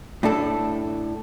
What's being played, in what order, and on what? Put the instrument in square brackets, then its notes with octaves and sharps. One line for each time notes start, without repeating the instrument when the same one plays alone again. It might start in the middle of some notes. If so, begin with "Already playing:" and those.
[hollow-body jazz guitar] A2 D4 A4